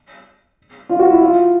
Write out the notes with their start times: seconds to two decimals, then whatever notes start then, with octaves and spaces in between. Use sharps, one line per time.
0.89 F4
0.99 F#4
1.10 E4
1.21 F4